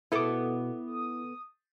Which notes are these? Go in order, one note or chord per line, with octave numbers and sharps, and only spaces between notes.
B2 B3 E4 A4 D6
D#6